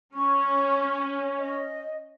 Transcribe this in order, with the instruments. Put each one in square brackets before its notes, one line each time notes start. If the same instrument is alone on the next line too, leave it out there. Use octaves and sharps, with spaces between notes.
[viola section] C#4 [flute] C#6
[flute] D#5